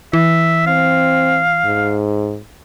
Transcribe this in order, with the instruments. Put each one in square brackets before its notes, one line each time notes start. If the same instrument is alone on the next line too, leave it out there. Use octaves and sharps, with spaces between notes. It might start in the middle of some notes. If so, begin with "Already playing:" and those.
[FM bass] E3 [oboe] E5
[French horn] C4 [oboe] F5
[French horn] G#2